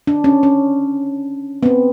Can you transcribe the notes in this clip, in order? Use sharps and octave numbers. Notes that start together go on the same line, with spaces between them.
D4
C#4
C#4
B3
C4